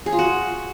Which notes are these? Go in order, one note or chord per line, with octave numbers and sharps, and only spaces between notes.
G#4
F4
F#4